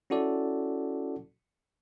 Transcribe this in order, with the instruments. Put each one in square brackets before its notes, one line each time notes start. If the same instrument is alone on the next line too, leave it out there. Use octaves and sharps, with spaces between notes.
[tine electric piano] C#4 E4 F#4 A4 D5